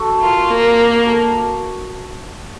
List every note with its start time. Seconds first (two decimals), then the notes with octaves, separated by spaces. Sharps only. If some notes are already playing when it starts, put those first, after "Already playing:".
Already playing: F#4 A4
0.22 F4 A#4
0.50 A#3 A#4
1.02 F#4 A4